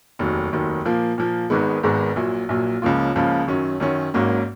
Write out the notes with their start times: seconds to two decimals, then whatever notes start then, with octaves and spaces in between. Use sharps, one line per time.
0.19 F1 D#2 D#3 F#3
0.52 F1 D#2 D#3 F#3
0.85 A#2 F3 A#3
1.18 A#2 F3 A#3
1.50 G#1 G#2 D#3 G#3 B3
1.83 G#1 G#2 D#3 G#3 B3
2.16 A#1 A#2 F#3
2.49 A#1 A#2 F#3
2.82 C#2 C#3 F3 A#3 F4
3.16 C#2 C#3 F3 A#3 F4
3.48 F#2 D#3 F#3 C#4
3.80 F#2 D#3 F#3 C#4
4.14 G#1 G#2 F#3 A#3 C#4